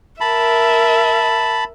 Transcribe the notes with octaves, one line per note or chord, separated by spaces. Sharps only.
A#4 E5 A5 B5